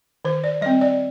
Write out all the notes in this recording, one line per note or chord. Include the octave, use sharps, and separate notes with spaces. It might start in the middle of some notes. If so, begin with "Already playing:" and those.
D#3 C5
D5
G3 C4 D#5
D5